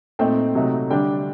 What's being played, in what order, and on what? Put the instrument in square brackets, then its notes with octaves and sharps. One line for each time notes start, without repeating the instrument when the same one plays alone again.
[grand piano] A#2 A3 C4 D#4 G5
C3 F#3 A3 D#4
D3 G3 D4 G5